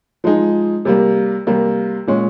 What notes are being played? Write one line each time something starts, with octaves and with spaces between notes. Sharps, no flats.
F3 G#3 D#4 G#4
C3 G3 A#3
C3 G3 A#3
A#2 G#3 C#4